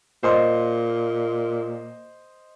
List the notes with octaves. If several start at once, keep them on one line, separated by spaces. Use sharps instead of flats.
A#2 C5 D#5 C6